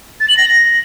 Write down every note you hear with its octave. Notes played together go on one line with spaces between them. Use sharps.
A6
F#7
A#6